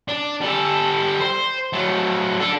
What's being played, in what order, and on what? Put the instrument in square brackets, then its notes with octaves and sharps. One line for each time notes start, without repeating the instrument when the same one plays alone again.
[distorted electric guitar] D4
G3 A4
C5
F#3 A3
D4 A4